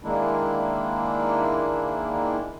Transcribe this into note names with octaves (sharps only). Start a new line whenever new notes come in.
D#3 G#3 A#3 D4 E4